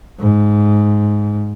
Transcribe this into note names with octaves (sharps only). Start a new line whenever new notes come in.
G#2